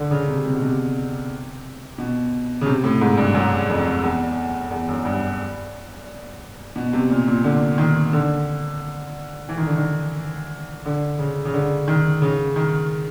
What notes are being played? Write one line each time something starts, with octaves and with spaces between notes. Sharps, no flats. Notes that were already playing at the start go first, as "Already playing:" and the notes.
Already playing: D3
C#3
C3
C3
B2
C3
B2
C#3
C3
A2
G#2
G2
F#2
F2
E2
E2
F#2
G2
B2
C3
A#2
A#2
D3
D#3
D3
E3
D#3
D3
D#3
D3
C#3
C#3
D3
D#3
C#3
D#3